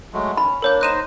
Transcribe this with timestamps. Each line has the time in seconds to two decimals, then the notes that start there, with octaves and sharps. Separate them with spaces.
0.13 F#3 G#3 A3
0.37 C#4 B5
0.62 A#3 D4 A#4 C#5 G6
0.81 D#4 C5 D#5 F#6 D#7 E7